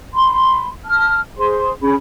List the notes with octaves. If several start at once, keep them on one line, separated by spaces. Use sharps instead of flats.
B5 C6
A5 F6
G#4 C5 C6
C#4 G#4 B5